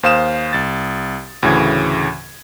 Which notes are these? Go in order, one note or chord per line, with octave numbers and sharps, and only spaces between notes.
D#2 C5 F5 D#6 E7
C2 A6
D2 A2 C#3 E3 G#6